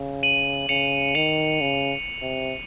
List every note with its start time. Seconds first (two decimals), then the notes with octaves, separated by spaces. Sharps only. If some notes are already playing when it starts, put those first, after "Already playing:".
Already playing: C#3
0.23 D#7 F#7
0.69 C#3 C#7 F7
1.15 D#3 C#7 F7
1.61 C#3
2.22 C3